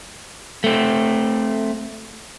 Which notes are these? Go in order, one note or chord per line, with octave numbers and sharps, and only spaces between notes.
A3 C4